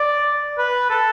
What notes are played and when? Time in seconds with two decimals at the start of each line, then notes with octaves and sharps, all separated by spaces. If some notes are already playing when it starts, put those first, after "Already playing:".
Already playing: D5
0.58 B4
0.90 A4